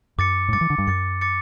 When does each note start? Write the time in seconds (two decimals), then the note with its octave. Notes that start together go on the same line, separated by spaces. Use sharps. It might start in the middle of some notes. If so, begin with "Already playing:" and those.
0.18 F#2 D6 A6 C#7
0.48 A2
0.53 G2 D6 A6 C#7
0.61 E3
0.70 D3
0.78 G2
0.87 F#2 D6 A6 C#7
1.21 D6 A6 C#7